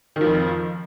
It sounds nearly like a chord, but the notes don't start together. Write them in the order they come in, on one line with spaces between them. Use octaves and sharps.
D#3 F3 F2